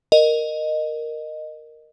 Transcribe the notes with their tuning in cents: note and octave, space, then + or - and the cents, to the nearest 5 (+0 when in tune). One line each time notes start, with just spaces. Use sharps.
A#4 +0 D#5 -15